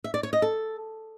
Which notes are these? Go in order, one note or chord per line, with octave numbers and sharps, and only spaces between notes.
E5
D5
C#5
D#5
A4